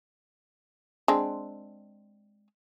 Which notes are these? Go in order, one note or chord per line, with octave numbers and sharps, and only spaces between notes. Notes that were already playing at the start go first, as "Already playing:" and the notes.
G#3 C4 D4